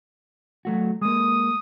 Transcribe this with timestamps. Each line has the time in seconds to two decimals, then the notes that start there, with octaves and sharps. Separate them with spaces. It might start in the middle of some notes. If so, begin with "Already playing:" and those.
0.65 F#3 A3 F#4
1.01 G#3 A#3 D#6